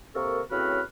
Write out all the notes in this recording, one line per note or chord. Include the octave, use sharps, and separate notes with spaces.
C3 A#3 A4 A#4 C#6
A2 C#3 C4 F#4 B4 F6